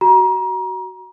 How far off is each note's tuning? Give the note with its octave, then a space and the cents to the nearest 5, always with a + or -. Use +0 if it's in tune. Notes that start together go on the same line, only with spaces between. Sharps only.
F#4 +20 A#5 +30